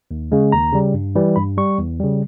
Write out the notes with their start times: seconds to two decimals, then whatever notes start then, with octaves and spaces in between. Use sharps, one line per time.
0.11 D#2
0.32 C#3 G#3
0.52 D#2 A#5
0.73 C#3 G3
0.94 G2
1.16 E3 G3
1.36 G2 B5
1.57 G3 C#6
1.78 E2
2.00 C#3 G3